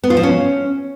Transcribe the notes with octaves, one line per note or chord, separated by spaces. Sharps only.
B3
F4
F3
C#4